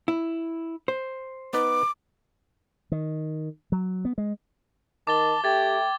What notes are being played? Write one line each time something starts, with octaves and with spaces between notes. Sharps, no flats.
E4
C5
B3 D#4 B4 D6
D#3
F#3
B3
G#3
D#3 A5 D6 A6 G7
A3 G4 G5 G#6 A6